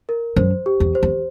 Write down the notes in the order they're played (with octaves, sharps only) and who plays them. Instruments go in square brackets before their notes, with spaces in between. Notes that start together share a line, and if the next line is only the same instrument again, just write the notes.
[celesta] A#4
[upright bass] F#2 [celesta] C5
[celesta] G4
[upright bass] E2
[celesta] C5
[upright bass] E2